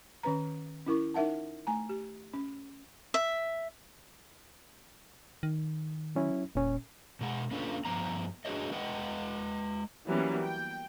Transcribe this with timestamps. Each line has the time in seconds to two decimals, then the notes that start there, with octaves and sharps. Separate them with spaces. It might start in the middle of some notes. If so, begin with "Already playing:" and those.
0.23 D#3 C#4 B4 A#5
0.87 C#4 E4 A#4 C#6
1.14 D#4 A#4 E5 F#5 A5
1.67 A3 G#5 A#5
1.89 G4
2.34 C#4
3.14 E5
5.43 D#3
6.15 F#3 C#4 E4
6.55 E1 A#2 C#4
7.21 B2 G#3 F#5
7.51 A#3 C#4 D4 F4 A4 B4
7.85 G2 F3 B3 A#5
8.45 D4 F#4 G#4 B4 C#5 D#5
8.72 G#3 B4 D#5 F#5 G5
10.07 E3 F#3 G3 A#3 B3 C#4
10.41 G5